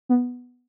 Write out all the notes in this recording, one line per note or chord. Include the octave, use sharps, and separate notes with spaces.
B3